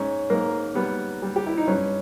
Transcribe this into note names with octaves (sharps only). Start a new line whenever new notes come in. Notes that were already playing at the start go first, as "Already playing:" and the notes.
Already playing: G#2 C#4
G#2 A#3
G3 B3
G3
G4
E4
D#4
G2 C#4